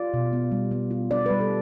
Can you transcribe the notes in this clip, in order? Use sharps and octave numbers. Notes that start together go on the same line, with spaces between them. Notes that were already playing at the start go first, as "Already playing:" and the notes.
Already playing: F4 D5
B2
B3
G3
B3
F4
D4 D5
G3 B4
A4